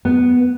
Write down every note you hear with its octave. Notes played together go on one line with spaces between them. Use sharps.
B3